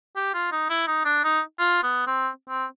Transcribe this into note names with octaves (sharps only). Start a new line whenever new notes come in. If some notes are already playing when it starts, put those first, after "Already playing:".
G4
F4
D#4
E4
D#4
D4
D#4
F4
B3
C4
C4